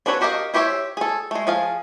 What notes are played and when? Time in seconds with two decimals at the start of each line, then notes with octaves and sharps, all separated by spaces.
0.06 C4 D4 F#4 B4 C#5
0.21 F#4 G4 A#4 D#5 F5
0.54 E4 G4 C5 C#5 E5
0.97 G#4 A4
1.31 G#3 A3
1.47 F3 G#4 F5